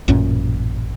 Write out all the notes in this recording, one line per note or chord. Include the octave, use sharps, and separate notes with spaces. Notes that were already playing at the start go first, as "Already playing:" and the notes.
A1 F#2 A#2 C#4